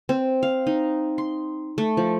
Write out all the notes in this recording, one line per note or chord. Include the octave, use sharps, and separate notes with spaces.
C4
F5
D#4
C6
A3
F3